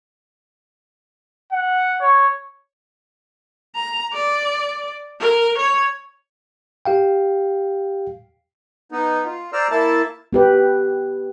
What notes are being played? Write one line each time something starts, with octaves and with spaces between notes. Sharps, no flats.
F#5
C#5
A#5
D5
A#4
C#5
G4 F5 G5
B3 D#4
F4
C5 D5 A#5 E6 F6
A#3 E4 A5
B3 G4 B4